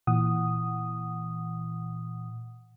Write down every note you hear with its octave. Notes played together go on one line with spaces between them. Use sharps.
A#2 E3 F#5 D#6